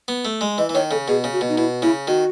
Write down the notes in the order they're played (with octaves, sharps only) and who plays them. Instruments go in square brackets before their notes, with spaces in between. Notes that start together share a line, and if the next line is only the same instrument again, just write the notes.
[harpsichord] B3
A3
G#3
[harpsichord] E3 [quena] D#5
[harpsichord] E3
[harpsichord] D#3 [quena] C#5
[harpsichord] C#3 [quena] A4
[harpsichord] B2 [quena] G#4
[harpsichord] C#3
[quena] F#4
[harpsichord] B2
[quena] D#4
[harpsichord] B2 [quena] E4
[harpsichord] C#3 [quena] E4
[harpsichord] D#3 [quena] F#4